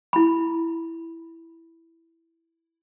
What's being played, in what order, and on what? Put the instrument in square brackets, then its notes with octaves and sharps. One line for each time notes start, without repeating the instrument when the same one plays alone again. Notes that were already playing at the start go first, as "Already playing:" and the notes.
[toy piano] E4 B5